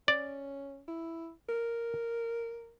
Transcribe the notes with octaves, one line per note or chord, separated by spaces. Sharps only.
C#4 D5
E4
A#4